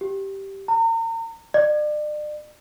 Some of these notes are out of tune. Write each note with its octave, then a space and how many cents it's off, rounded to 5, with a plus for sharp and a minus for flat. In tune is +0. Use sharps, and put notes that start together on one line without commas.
G4 -10
A#5 -40
D5 +40